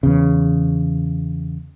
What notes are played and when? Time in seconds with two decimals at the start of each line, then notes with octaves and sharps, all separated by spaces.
0.03 E2 C#3